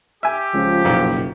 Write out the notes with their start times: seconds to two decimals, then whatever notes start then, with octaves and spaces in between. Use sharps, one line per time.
0.23 G4 E5 G#5
0.54 C#2 F3
0.85 F#1 B1 A#2